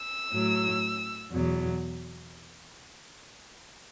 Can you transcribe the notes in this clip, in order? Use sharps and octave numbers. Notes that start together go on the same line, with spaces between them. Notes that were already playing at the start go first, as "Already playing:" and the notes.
Already playing: E6
A2 F#3
E2 B2 F#3